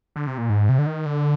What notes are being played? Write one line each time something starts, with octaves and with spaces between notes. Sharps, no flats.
D3
C3
A#2
G#2
C3
D3
D#3
D3